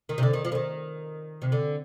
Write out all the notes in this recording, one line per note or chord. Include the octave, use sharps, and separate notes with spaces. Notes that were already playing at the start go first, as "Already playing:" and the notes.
D#3
C3
D3
D#3
F3
D3
D#3
C3
D3